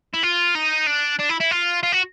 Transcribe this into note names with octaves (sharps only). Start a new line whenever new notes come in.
E4
F4
D#4
D4
D4
E4
E4
F4
F4
F#4